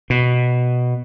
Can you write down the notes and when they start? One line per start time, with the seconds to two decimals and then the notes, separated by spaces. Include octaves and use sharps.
0.10 B2